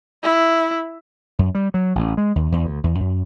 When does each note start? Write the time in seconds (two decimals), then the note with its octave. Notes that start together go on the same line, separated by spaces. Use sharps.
0.23 E4
1.39 F#2
1.55 G3
1.74 F#3
1.95 A1
2.17 G#3
2.36 D#2
2.52 E2
2.66 D2
2.84 E2
3.00 F#2